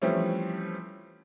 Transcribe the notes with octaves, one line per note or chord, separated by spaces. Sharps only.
E3 F3 G3 A3 C4 C#4